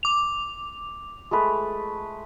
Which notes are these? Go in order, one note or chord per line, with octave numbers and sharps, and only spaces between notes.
D6 F7
G#3 A3 B4